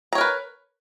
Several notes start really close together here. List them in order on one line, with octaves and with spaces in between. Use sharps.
A#5 C#5 A#4 B4